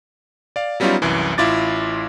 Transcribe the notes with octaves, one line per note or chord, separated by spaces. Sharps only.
D5 F5
F#3 G3 B3 C#4 D#4 F4
C2 F#2 E3
A1 E4 F4 D6 A6